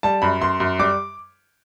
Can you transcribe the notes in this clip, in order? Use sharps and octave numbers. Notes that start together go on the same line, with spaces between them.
G3 A5
F#2 B5
F#2 C6
F#2
G3 D6